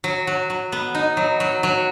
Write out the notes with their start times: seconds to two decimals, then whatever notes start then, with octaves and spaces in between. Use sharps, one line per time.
0.04 F#3
0.27 F#3
0.50 F#3
0.72 B3
0.95 D#4
1.17 F#3
1.40 F#3
1.63 F#3